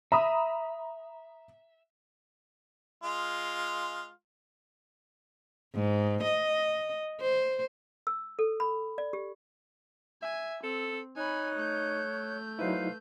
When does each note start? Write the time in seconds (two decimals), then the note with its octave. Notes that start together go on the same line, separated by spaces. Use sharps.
0.12 E5 A#5 B5 D#6
3.04 G#3 F4
5.74 G#2
6.23 D#5
7.21 C5
8.07 E6
8.39 A4
8.60 B5
8.98 D5
9.13 G4
10.22 E5 G#5
10.63 C4 A4
11.17 D#4 C#5 G#5 B5 F#6
11.55 A3 G6
12.59 F#3 D#4 E4 B4 C5 F5